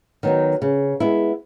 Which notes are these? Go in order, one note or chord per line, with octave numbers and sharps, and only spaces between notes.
D#3 F#3 B3 D#4
C#3
G#3 B3 E4